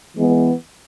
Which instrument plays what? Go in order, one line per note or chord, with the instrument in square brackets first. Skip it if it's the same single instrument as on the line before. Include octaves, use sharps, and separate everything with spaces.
[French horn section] E3 G#3 B3